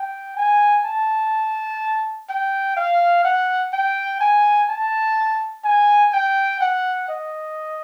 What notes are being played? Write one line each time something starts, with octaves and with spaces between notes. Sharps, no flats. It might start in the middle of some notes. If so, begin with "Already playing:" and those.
Already playing: G5
G#5
A5
G5
F5
F#5
G5
G#5
A5
G#5
G5
F#5
D#5